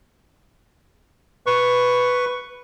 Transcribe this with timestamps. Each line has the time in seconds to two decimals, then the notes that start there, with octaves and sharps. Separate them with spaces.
1.46 B4 C#6